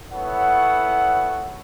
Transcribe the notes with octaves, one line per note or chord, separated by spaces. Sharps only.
B3 E4 A4 C#5 F#5